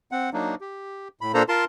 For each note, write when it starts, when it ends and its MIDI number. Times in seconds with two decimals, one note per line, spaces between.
0.12 0.30 60
0.12 0.30 78
0.33 0.55 54
0.33 0.55 58
0.33 0.55 62
0.33 0.55 63
0.61 1.08 67
1.21 1.32 45
1.21 1.32 83
1.34 1.43 46
1.34 1.43 58
1.34 1.43 62
1.34 1.43 69
1.34 1.43 72
1.34 1.43 82
1.49 1.65 65
1.49 1.65 70
1.49 1.65 81
1.49 1.65 84